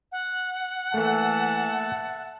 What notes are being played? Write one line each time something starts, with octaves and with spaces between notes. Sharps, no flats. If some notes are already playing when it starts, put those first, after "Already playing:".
F#5
E3 A3 A#3 A4 E5 A5